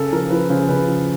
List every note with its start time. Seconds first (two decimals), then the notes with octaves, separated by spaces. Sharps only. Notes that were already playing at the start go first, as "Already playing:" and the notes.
Already playing: C#3 A4
0.12 F3 A#4
0.31 F3 B4
0.50 C#3 C5
0.69 C#3 B4
0.88 F3